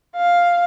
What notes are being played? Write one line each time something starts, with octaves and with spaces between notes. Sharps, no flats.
F5